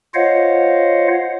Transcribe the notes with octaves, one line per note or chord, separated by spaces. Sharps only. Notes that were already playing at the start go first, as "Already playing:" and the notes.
F4 C5 C#5 D#5 F5 F#5